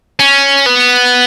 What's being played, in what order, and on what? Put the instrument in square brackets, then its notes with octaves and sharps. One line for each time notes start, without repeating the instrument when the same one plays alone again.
[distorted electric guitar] C#4
B3